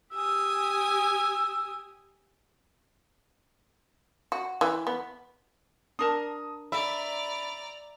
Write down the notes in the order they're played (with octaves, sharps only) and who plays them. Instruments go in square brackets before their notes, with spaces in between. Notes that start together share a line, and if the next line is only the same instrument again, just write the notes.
[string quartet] G4 G#5 D#6 [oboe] E6
[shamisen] F#4
E3
B3
[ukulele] D4 A#4 A5 [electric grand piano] D#6
[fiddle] D5 A#5 [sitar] E5 [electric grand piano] B5